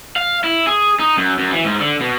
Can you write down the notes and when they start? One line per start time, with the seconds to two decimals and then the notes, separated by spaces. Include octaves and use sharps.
0.16 F5
0.44 E4
0.67 G#4
0.99 D#4
1.17 F#2
1.39 F#2
1.52 E3
1.64 G#2
1.80 D3
2.01 B2